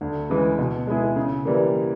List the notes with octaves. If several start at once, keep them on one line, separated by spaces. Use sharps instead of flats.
D2
C#3 E3 G#3
B2
G#3 B3 E4 G#4
C#3
E3 G3 A#3